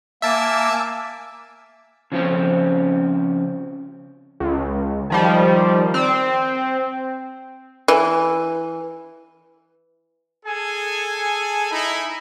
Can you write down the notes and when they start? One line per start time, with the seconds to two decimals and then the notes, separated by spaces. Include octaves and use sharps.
0.22 A#3 E5 G#5 A5 D6 E6
2.12 C#3 F3 C4 C#4
4.40 C#2
5.10 D#3 F3 G3
5.94 C4
7.88 E3
10.46 G#4 A4 G#5
11.71 D#4 E4